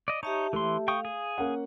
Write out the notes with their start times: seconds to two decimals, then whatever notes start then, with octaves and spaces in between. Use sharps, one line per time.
0.08 D5 D#5
0.23 D#4 G4 C#5 E5 A5
0.53 E3 A3 A4 C6
0.88 F5 G5 C#6 D#6
1.05 G#4
1.38 A#3 C#4 F#5